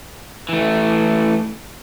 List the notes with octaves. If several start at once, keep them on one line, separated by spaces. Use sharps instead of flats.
E3 A3